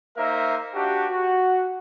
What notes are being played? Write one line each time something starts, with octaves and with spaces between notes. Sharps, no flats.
A#3 D#4 A#4 C5 E5
D4 F#4 G4
F#4